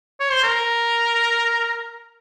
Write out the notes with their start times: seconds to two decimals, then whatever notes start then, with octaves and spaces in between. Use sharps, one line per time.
0.20 C#5
0.31 C5
0.43 A#4